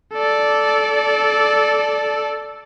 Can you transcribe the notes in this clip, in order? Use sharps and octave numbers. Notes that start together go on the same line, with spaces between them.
A4 D5